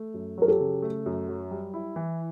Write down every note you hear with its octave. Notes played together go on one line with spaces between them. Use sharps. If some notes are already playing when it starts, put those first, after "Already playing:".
Already playing: A3
F#2
F#3 A#4
G4 A4
C#3
A3
F#2
F#3
G3
E4
E3